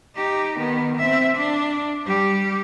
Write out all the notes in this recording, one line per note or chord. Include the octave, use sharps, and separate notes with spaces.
D#4 G4
D#3 B3
C4 E5
D4
G3 G4